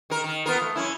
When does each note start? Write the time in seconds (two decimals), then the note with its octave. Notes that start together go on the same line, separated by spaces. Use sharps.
0.10 D#3 A#4
0.24 D#3
0.46 B3 F4 A#4
0.62 A3
0.76 F#2 C#4 E4